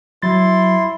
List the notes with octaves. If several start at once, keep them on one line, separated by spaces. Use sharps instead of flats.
F#3 E4 C6 A6